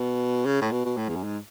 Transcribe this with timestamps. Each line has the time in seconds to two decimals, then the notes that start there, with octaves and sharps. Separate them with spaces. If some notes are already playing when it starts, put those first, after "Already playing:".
Already playing: B2
0.45 C#3
0.61 A2
0.71 B2
0.85 B2
0.97 A2
1.09 E2
1.15 F#2
1.24 G#2